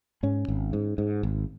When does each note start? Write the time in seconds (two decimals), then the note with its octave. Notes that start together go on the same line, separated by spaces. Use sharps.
0.23 G#2 C#4
0.48 G#1
0.73 G#2
0.98 G#2
1.23 G#1